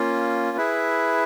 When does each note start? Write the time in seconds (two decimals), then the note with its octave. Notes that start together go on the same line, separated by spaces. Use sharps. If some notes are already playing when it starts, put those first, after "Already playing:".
Already playing: A#3 C#4 F4
0.57 E4 G#4 B4 E5